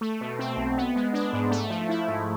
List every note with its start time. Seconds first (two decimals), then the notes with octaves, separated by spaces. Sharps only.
0.01 A3
0.21 B2
0.39 C4
0.57 B1
0.77 B3
0.96 G#3
1.13 D4
1.33 G#2
1.51 A3
1.70 F3
1.89 E4
2.08 G#2